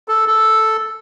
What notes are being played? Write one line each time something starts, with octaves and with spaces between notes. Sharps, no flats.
A4
A4